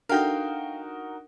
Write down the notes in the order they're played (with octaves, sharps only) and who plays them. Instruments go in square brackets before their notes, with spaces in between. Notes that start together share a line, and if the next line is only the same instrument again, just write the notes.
[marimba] D4 A4 [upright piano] D#4 F#4 A#4 [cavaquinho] F5 G5